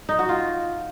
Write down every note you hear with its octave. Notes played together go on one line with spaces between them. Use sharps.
D#4
F#4
F4